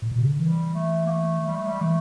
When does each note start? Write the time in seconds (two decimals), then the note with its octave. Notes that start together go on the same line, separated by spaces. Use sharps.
0.02 A2
0.11 A#2
0.21 C#3
0.30 D3
0.39 E3 G3
0.74 A3
1.07 A#3
1.10 A3
1.46 G3
1.56 A3
1.67 G3
1.81 E3 A3